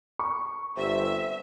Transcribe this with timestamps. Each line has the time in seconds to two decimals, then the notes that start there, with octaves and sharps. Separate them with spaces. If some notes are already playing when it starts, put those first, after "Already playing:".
0.19 C#6
0.77 G1 C3 E5